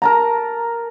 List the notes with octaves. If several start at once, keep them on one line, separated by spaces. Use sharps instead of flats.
A#4 A5 A#5